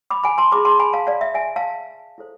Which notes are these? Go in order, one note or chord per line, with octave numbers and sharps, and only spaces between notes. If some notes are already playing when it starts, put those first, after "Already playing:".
B5 D6
G#5 B5
A5 C6
E4 G#4 B4 B5 D6
A5 C6
G#5 B5
F5 A5
D5 F5
E5
E5 G#5
F5 A5
E4 A4 C5